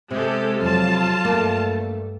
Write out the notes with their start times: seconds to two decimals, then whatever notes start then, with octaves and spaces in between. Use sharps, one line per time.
0.11 C3 G#3 G4 A4
0.58 F2 F#3 F4 A5
1.25 G2 A3 A#3